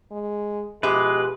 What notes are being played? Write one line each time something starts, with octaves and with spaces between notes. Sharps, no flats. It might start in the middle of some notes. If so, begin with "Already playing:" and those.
G#3
B2 F3 G#3 G4 B4 E5